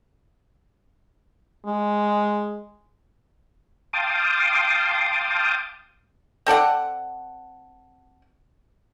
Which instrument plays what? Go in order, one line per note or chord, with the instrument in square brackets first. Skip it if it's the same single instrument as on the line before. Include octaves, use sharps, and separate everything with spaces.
[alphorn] G#3
[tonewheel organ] F5 G5 A5 C6 D6 D#6
[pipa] C4 A4 D5 F#5